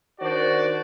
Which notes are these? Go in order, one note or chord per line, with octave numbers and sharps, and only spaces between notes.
D#3 D4 F#4 C5 D5